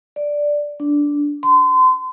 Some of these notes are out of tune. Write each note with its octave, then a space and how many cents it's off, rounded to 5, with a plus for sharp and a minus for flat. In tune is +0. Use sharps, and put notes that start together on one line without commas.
D5 +0
D4 -10
C6 -35